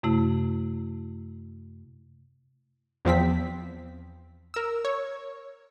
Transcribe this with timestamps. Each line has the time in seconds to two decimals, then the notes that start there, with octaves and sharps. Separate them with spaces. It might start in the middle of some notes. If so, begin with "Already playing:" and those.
0.03 F#2 C3 A3 E4
3.05 E2 F3 C4 B6
4.54 A#4 E6
4.85 C#5